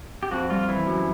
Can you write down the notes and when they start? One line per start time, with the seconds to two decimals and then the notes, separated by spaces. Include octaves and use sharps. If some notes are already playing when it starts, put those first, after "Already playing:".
0.23 G4
0.31 F2 F#4
0.50 G3 F4
0.68 E3 E4
0.87 F#2